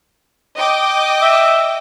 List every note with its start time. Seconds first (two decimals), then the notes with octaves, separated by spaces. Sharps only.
0.57 D#5 G5 D6
1.22 E5